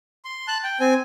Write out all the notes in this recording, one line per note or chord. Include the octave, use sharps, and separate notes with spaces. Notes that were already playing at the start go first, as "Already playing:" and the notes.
C6
A5 F#6
G5
C4 G#5